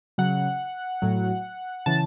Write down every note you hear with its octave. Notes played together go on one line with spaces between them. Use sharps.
C#3 F#3 F#5
A2 F#3
C#3 E3 A5